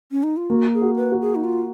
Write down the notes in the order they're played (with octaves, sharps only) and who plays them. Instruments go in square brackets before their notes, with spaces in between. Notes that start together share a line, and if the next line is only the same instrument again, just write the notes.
[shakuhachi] C#4
D#4
F4
[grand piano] A#3 [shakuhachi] F#4
[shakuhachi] G#4
[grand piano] F#4
[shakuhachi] B4
[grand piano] F#4
[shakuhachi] G#4
D#4
F4